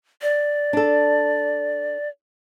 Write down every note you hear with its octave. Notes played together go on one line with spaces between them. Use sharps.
D5
D4 A4